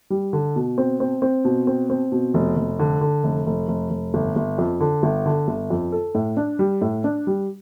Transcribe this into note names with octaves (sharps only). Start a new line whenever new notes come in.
G3
D3
B2
C4
C4
C4
B2
C4
C4
B2
F1
F1
D3
D3
F1
F1
F1
F1
G1
G1
F2
D3
G1
D3
G1
F2
A4
A2
D4
G3
A2
D4
G3